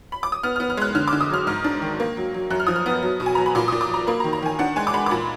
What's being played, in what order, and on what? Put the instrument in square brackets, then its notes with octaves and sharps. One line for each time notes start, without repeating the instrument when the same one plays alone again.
[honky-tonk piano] B5
D6
D#6
B3 F6
B3 F6
F6
G#3 F#6
D3 F6
D6
D3
D#6
F#3 F6
G#2 F6
D4
D#3
A#3
F#3
F#3
F#2 F#6
F6
F3 D#6
F6
B3
F#3
B2
G#5
F#3 A#5
B5
A#2 D6
A#2 D#6
D6
F#3 A#5
A#3 B5
A#5
D#3
A#5
D#3 G#5
D4 F#5
G#3 G#5
D6
G#3 B5
D6
A#2 B5